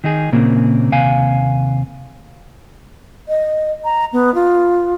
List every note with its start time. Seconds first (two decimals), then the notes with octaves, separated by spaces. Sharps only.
0.04 D#3 D#4 G#4
0.32 A#2 C#3 A#3 C4
0.92 D#2 C3 F5 G#5
3.29 D#5
3.84 A#5
4.13 B3
4.35 F4